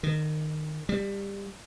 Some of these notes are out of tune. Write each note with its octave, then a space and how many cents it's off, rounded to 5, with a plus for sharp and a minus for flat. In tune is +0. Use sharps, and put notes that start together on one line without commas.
D#3 -20
G3 +20